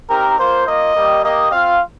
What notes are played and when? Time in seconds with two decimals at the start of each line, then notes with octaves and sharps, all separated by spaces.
0.10 C4 D#4 G4 A#4
0.39 A#3 F4 C5
0.68 A#3 F4 D#5
0.96 G3 A#3 G4
1.24 A#3 G4 D#5
1.52 C4 F4 F5